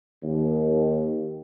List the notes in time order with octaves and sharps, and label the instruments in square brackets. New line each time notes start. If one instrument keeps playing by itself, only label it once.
[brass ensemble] D#2